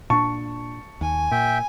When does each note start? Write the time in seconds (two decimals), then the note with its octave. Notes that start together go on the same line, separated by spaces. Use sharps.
0.10 A#2 D4 A5 C#6
1.01 D#2 G#5
1.31 A#2 E5 G5